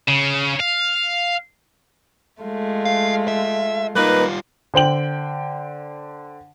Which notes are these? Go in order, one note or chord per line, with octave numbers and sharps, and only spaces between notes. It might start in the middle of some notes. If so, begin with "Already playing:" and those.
C#3
F5
G#3 A3 F4
F5
E5
G3 A#3 D#4 F4 B4
D3 C5 G5 F#7